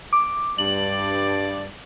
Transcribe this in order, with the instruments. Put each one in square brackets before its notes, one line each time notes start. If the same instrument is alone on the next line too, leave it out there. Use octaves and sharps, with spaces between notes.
[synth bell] D6
[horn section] G2 D5 [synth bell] F#7